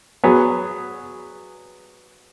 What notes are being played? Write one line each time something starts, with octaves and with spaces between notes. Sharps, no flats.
F#3 B3 G#4